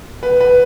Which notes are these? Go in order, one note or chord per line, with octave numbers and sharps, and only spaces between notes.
B4
B4